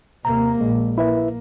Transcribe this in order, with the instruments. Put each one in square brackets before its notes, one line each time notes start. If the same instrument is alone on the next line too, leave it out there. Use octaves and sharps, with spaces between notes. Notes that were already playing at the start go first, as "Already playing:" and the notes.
[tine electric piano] D#2 A#5 [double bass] C3 A#3
[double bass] A#1 [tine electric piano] G#3
[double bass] A#3 [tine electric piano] E4 B4 E5